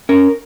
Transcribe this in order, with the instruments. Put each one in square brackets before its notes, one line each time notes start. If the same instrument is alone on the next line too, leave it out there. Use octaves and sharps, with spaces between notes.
[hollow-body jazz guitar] C#4 A#4